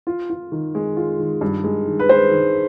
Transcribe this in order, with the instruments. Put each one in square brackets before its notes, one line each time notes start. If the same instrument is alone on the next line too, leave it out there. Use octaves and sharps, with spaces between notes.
[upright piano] F4
F4
D#3
G#3
F4
D#3
G2
G#3
D#3
[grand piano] B4
[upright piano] G#3 [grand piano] C5
[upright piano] D#3